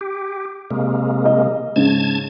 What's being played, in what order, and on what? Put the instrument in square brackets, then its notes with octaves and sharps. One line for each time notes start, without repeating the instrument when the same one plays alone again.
[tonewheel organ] G4
C3 G#3 A#3
[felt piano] D#5
[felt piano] G#2 C#3 [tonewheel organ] A5 G#6